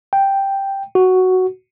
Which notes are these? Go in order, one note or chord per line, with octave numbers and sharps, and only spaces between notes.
G5
F#4